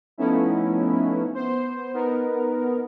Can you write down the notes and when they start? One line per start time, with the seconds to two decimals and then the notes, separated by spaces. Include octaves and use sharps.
0.18 F3 A3 B3 C#4 D#4 E4
1.34 B3 C5
1.94 B3 D#4 A#4